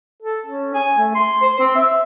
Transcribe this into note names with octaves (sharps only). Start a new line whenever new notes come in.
A4
C#4
G#5
A3
C6
C5
C4
E5